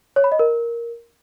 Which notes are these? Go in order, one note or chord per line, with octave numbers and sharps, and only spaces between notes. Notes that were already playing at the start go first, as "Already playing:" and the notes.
C#5
B5
D#5
A#4